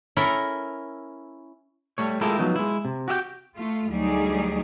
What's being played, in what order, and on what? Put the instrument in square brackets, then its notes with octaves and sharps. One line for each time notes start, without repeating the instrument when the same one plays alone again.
[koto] C#4 E4 A4 A#4
[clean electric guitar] G3 A3 C#5
G#3 E4 F4 G4 A4 A#4
F3 F#3 B3 D#4
G#3 E4
C3
F#4 G4 E5 G5
[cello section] A3 F4
D2 F#3 G3 D#4 G#4 D5